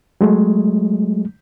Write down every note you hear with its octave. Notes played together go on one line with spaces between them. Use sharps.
F#3 G#3 A3